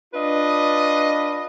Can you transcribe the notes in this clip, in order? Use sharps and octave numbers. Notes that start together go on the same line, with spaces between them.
D4 F4 B4 D#5